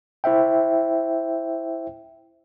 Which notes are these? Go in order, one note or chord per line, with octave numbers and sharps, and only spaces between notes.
E4 C5 E5 G5